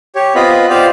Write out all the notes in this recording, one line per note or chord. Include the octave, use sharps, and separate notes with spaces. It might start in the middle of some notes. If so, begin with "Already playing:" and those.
G4 C#5
B3 C4 F4 B4 D#5 B5
F4 G4 C5 D5 F5